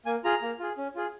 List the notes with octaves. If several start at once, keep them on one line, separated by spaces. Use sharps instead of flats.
A#3 G#5
F4 G#4 A#5
A#3
F4 G#4
C#4
F4 G#4